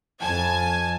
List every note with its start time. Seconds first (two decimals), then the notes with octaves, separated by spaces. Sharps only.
0.20 F2 G#5 A5 G#6